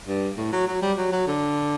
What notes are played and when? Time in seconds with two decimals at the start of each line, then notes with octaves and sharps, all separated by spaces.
0.08 G2
0.37 A2
0.52 F#3
0.68 F#3
0.82 G3
0.98 F#3
1.12 F#3
1.27 D3